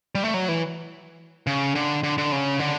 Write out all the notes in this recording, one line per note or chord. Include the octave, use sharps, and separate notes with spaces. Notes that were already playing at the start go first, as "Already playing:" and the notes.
G3
A3
F#3
E3
C#3
D3
D3
D3
C#3
D3